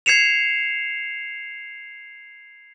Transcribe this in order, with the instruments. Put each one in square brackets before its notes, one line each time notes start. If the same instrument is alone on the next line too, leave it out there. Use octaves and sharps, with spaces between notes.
[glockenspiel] G#6 C7 C#7 E7 F7